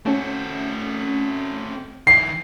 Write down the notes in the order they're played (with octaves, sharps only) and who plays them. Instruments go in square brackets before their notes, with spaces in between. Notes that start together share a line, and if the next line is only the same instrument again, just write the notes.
[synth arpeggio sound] A3 C#4 [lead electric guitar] C4 F#4
[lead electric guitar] D#3 E4 [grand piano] C7